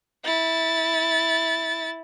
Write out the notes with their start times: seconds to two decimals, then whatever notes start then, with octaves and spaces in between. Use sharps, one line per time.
0.25 E4 A6